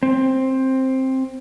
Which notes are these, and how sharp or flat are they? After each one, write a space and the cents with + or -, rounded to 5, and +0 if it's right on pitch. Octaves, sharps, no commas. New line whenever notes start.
C4 +10